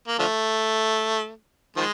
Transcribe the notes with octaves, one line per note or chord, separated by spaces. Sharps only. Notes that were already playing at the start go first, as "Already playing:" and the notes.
A#3
D3 F3 A3
D#3 F3 G#3